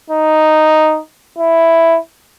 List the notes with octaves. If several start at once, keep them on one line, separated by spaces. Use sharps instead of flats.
D#4
E4